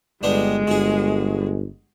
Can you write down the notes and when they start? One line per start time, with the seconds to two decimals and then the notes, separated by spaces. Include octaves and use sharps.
0.23 G1 G3 G#3 B3 D4
0.67 G1 F#4 G#4